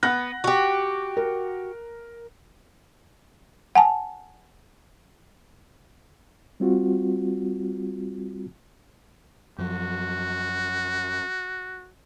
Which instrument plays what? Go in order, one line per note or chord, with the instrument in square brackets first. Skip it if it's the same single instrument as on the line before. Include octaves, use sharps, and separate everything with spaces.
[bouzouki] B3 [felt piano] F#5 F#6 A#6
[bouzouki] F#4 G4
[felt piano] A#4
[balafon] F#5 G#5 A5
[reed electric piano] G3 C4 F4 F#4
[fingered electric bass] F#2 F3 [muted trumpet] F#4